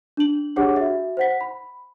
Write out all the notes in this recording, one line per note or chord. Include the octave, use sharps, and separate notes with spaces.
D4 F#7
D4 G4 G#4 C#5 F#5 D6
F#4 E5
C5 F#5 B6
B5